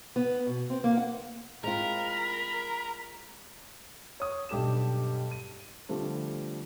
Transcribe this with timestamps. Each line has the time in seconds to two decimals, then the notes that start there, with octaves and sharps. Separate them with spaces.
0.16 B3
0.46 B2
0.70 C4
0.84 A#3
0.97 F#5
1.64 G#3 C4 F4 A#4 B5
4.20 C#5 D#6
4.49 B1 G2 G4 A4 D6 E7
5.31 D#7
5.89 D3 F3 G3 A3 C4